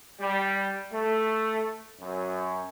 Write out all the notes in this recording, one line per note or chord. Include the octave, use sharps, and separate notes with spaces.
G3
A3
F#2